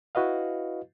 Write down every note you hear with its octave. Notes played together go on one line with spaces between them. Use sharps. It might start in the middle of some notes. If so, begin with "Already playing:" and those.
E4 F#4 B4 D#5 F5